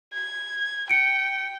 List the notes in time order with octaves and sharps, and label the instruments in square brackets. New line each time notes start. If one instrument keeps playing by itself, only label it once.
[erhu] G#6
[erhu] G5 [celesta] C#7 D7